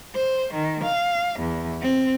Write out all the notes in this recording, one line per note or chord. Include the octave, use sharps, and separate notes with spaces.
C5
D#3
F5
E2
C4